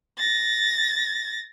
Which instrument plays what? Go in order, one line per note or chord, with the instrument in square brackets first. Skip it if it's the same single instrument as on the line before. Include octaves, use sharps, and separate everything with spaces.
[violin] A6 A#6